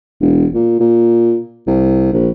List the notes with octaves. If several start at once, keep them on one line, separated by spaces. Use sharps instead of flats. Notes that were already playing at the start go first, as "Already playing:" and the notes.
E1
A#2
A#2
C2
A#1